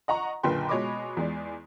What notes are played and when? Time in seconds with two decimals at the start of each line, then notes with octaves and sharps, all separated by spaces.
0.08 D#5 F#5 A#5 C#6
0.43 F#1 A#2 D3 B4 G5 C6
0.69 B2 G#3 C#5 D#5 B5 D6
1.17 E2 G#3 D5